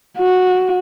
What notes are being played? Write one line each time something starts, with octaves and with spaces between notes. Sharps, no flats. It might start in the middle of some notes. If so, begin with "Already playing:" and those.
F#4